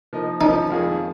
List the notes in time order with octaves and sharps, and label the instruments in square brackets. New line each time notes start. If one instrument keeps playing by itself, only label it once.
[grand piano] F3 A#3 D#4
[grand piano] F3 A#3 C#4 [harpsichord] D#4
[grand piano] F2 D#3 A#3 F4 G#4